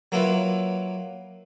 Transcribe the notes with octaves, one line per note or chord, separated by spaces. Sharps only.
F#3 A#3 E4 F4 B4